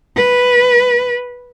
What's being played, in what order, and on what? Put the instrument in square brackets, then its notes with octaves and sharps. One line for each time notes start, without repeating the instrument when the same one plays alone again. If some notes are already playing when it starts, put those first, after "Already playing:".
[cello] B4